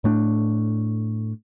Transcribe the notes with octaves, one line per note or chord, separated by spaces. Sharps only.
A2 A3 D4